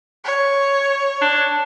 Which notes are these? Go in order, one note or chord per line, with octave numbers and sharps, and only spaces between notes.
C#5
D4